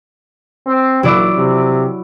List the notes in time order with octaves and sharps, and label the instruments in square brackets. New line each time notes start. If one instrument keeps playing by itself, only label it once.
[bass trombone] C4
[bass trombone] A#1 [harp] F#3 E4 D5
[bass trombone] C3